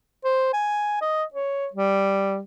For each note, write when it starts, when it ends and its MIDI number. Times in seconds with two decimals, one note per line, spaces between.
0.24 0.50 72
0.53 0.97 80
1.01 1.24 75
1.34 1.67 73
1.73 2.41 55